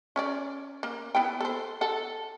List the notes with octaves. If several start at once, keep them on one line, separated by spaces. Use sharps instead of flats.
C#4 C#5 D5
A#3
B3 E4 G5
A4 C5
A4 F#5